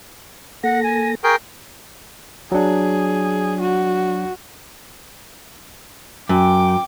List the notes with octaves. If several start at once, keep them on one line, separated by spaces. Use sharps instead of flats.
A#3 A4 F#5 A#6
G#5
G#4 A#4 G5 C#6
F#3 D4 G#4
F#4
F#2 G5 D6